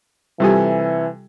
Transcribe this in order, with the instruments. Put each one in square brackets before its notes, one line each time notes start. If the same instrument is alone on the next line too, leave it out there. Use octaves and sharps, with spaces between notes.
[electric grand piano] C3 A4 G#5 [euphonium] E3 [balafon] G3 F4 G4